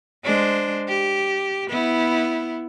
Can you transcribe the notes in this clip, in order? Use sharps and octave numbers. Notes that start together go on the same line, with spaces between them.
G#3 D4 C5
G4
B3 E4